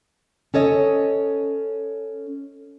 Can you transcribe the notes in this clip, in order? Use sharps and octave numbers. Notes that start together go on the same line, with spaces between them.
C#4 A4 C#5 D#5